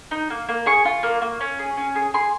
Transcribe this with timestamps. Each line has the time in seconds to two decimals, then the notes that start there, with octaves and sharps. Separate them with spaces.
0.11 D#4
0.30 A#3
0.49 A#3
0.66 G#4 C#6
0.85 F4
1.03 A#3
1.22 A#3
1.41 C#4
1.59 G#4
1.77 C#4
1.95 G#4
2.14 G#4 C6